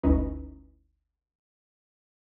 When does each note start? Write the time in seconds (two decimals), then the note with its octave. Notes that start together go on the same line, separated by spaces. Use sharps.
0.03 G1 D2 C#4 D#4 E4 B4